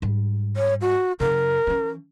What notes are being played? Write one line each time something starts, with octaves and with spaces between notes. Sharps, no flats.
G#2 G3
C#5
F#4
F#2 C#3 A#4
E3 C#4